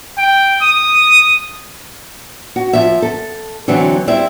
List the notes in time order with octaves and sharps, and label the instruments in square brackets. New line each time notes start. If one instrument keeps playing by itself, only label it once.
[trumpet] G5
D#6
[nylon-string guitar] F#4
F3 E5
A4
D3 E3 F#3 C4
G3 C4 E4 E5